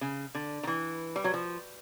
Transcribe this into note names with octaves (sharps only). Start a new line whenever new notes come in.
C#3
D3
D#3
E3
G3
F#3
F3